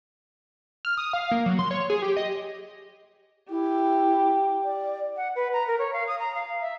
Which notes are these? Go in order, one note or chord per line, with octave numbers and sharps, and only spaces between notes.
F6
D#6
F5
A#3
F#3
C6
C#5
G#4
G4
D#5
E4 G4
D5
F#5
B4
A#5
A#4
C#5
F5
D#6
A#5
F5
E5